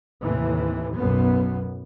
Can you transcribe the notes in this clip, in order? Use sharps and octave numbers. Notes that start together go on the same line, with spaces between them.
D#2 A2 C3 E3
B1 F#2 B2 B3